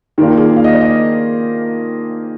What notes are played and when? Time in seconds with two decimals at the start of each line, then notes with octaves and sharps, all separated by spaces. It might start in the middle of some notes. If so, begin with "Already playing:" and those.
0.18 D#3 A#3 D4 F4 G4
0.37 G#4
0.56 F5
0.64 D#5
0.73 D5
0.81 D#5